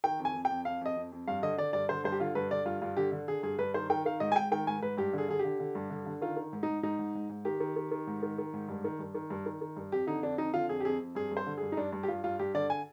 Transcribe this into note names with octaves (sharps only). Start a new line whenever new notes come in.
D#3 G5
F2
G#5
F2
F2 G5
F2 F5
F2 D#5
F2
F2
G2 F5
D3 D#5
D3 D5
G2 D5
D3 C5
G2 C5
G4
D3 F4
G2 B4
D3 D5
G2 F4
G2 F4
D3 G4
D3
D3 G#4
G2 G#4
G2 B4
D#3 C5
D#3 G5
D#3 F5
G#2 D#5
G#5
G#2 G5
D#3 G5
G#2 G#5
G#2 B4
G2 G4
D3 G#4
D3 G#4
G4
D3
D3
G2
D3
D3
D#3 F4
D#3
G#2
G#2 D#4
G#2 D#4
G#2
G#2
G#2
D#3 G4
D#3
D#3
D#3
G#2
D#3
D#3
G#2
G2
D#3
G2
D#3
G2
D#3
D#3
G2
F2 G4
D3 D#4
F2 D4
F2 D#4
D3 F4
F2 G#4
G4
F2 G#4
F2
G2 G#4
G2
C5
D3
G2 G#4
D#4
G2 D4
G2
G4
G2 F4
G2 F4
G2 G4
D3 D5
G#5